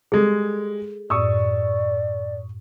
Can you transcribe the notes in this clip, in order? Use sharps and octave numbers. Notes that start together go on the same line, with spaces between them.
G3 G#3 G#4 A4
F#2 A2 D5 C#6 D#6 E6